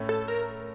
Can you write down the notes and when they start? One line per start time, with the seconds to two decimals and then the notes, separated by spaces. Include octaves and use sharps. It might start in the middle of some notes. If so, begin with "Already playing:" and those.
Already playing: A2 A3 C#4
0.09 A4
0.28 A#4